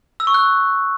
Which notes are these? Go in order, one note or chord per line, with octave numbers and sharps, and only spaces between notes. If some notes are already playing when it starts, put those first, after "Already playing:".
E6
C#6
F#6